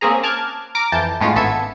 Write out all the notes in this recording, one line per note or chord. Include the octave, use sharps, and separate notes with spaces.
A#3 C4 C#4 G#4 A#5
A5 D6 F6 F#6 G#6
A#5 D6 F6
F2 E3 A5 G6
A2 G#3 B3 C#4 D4 F4
G#1 B3 A4 E5 G#6